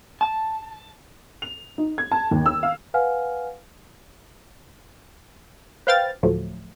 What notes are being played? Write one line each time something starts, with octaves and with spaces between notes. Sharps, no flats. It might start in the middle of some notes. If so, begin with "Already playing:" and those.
A5
F7
D#4
G#6
A5
D#2
E6
F5
B4 F5 F#5 G#5 F6
B4 C5 F5 G5 F6 A6
D2 A2 F3 F#3 A3